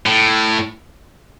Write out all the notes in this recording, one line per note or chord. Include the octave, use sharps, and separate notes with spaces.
A2